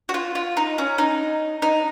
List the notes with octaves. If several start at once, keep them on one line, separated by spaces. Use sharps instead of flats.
F#4
F4
F4
D#4
C#4
D#4
D#4